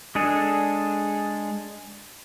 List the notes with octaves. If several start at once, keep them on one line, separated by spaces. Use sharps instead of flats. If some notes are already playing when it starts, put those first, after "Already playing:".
G#3 D4 G#4 A4